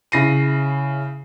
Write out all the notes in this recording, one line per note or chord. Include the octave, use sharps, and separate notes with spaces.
C#3 E4 A#6 C7 D#7